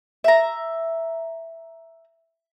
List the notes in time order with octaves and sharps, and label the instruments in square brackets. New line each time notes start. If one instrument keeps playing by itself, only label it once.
[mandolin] E5 A#5